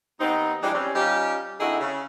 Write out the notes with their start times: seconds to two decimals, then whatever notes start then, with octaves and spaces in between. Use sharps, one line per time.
0.20 D#2 B3 C4 D#4
0.63 E3 F3 G3 G#3 D4 D5
0.75 G3 C4 C#4
0.95 G3 C#4 D#4 F4 G4
1.60 D3 C4 D#4 E4 F#4 G#4
1.80 C#3